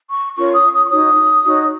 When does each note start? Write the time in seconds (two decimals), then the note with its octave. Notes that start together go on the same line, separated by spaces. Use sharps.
0.10 C#6
0.37 C#4 F4 A#4 C#5 C#6
0.54 D#6
0.72 D#6
0.86 C#6
0.91 D#4 F#4 C#5 D#6
1.45 D#4 F#4 C#5